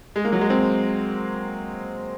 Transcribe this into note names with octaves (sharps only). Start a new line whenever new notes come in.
G#3
A#3
F#3
G#3
C4